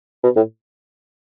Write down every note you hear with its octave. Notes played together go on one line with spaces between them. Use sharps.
B2
A2